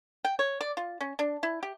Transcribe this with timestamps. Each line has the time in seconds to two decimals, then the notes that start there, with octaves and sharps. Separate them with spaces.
0.25 G5
0.39 C#5
0.61 D5
0.77 F4
1.01 C#4
1.19 D4
1.43 E4
1.63 G4